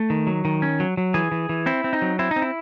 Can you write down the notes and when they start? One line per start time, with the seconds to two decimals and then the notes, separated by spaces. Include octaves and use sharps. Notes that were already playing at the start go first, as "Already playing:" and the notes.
Already playing: A3
0.10 D#3
0.27 F#3
0.45 D#3
0.62 C#4
0.80 F#3
0.97 F#3
1.14 E3 G#4
1.32 E3
1.49 E3
1.66 C4 E4
1.84 C4
1.93 D#4
2.02 F#3
2.19 C4 E4
2.31 D#4
2.36 C4
2.42 E4